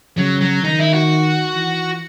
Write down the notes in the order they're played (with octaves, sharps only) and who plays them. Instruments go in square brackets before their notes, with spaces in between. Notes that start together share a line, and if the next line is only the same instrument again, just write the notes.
[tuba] C#3 [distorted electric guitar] F#3
[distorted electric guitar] F#3
[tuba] D#3 [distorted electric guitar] D#4
[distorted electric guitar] E4
F#4
[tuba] E3